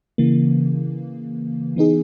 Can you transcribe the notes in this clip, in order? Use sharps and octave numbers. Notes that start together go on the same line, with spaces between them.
C#3 E3 A#3
E3 B3 D#4 G#4